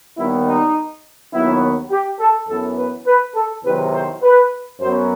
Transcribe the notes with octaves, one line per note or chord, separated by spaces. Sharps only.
D#2 D#3 G3 B3 E4
D#4
D#2 D#3 F#3 B3 E4
G4
A4
F#2 E3 B3 A4
B4
B4
A4
E2 C3 D#3 F#3 C4 B4
C5
B4
F#2 F#3 B3 C5